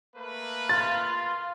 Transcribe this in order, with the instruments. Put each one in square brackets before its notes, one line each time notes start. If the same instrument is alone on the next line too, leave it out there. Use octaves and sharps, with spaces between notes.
[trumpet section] A3 A#3 B4
[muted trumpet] F4 [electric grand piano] A6